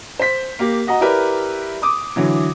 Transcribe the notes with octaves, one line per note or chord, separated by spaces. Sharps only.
C5 B6
A#3 G4
F#4 D#5 F#5 A#5
E4 G4 A#4 B4 D5
D6 D#6
D3 E3 F#3